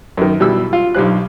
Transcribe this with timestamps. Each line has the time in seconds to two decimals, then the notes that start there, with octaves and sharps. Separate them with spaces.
0.17 F#2 D#3
0.40 B2 G3 E4 E6
0.73 F4
0.94 B1 G2 G3 C5 F#6